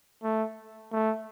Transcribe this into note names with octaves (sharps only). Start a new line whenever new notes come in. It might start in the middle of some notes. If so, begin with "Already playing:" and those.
A3
A3